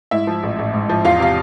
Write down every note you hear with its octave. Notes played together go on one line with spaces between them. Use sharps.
G#2 E4 E5
F3
A1
A1
G#2
F3
E2 F4 F5
C3 F5